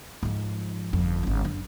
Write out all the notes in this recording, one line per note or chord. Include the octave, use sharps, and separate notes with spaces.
G#2 F3
G1 F2
G1 C#4
F#2 D4